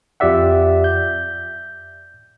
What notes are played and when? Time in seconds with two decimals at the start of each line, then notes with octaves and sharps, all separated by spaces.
0.20 F2 F4 G4 D5 E5 F#5
0.84 G6